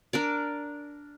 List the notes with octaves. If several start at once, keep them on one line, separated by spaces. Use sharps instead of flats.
D4 A#4 D5